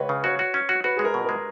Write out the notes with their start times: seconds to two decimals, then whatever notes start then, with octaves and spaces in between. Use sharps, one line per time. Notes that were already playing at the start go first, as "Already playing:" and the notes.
Already playing: C#2 B4 C#5
0.09 C#3
0.24 F#4 C#5
0.39 F#4
0.54 C#4
0.69 F#4
0.84 F#4 B4
0.96 G#3 G#4
1.04 A#4
1.14 B2
1.24 G#3 A#4